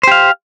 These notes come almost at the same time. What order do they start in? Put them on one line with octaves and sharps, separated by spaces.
C5 G4 F5